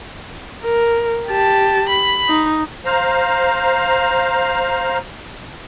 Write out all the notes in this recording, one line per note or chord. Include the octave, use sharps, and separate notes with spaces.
A#4
G4 A5
B5
D#4
C5 F5 A#5